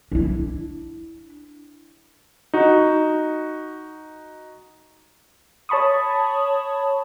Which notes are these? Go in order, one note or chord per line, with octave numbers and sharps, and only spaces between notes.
D4 E4
D#4 F#4
C#5 A5 B5 C#6 D#6